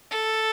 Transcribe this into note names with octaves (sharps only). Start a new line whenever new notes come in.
A4